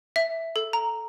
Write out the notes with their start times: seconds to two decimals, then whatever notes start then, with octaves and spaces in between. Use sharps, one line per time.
0.16 E5
0.56 A4
0.73 A#5